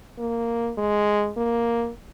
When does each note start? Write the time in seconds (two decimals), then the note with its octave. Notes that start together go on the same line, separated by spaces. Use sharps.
0.18 A#3
0.78 G#3
1.37 A#3